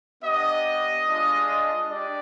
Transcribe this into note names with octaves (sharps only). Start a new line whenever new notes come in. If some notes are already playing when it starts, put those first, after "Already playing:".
B3 D4 G4 D#5
G#3 D4 F4
D4 G4 D5